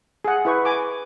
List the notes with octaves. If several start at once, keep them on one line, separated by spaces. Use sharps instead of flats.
G#4 F#5
E4 B4 C#6
G#5 D6